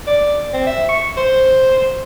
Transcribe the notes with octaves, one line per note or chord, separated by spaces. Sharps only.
D5
C4
E5
C#6
C5